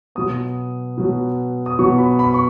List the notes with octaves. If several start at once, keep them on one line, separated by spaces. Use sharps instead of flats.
B2 F#3 B3 D#6
B2 F#3 B3
D#6
B2 F#3 B3 C#6
B5
B5
C#6